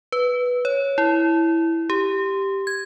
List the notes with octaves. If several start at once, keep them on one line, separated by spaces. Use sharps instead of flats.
B4
C#5
E4
G4
G#6